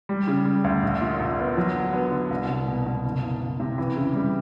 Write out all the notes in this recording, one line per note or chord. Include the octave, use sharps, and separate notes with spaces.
G3
C#3
G3
D2
A#1
A#2
A#1
B3
F#3
D3
B3
D3
C2
C2
B2
B2
F#1
F#1
F#1
C3
E3
C#3
G3